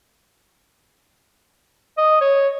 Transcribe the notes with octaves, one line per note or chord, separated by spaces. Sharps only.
D#5
C#5